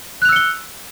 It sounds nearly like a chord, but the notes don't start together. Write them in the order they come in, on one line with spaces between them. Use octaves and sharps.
F#6 F7 E6 C#7 G7